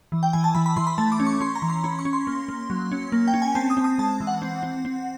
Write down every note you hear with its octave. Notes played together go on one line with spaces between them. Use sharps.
E3
G5
E3 G#5
A5
E3 B5
B5
E3 C6
B5
A3 A5
D6
C#4
C#6
C#4 C6
A#5
E3
C6
C#4 B5
C#6
C#4
C6
A#3
A#3
F#3
C#4
A#3
G5
C#4
G#5
C4 A5
D#6
C4
D#6
G#3 A5
E3
F#5
C4
C4
C4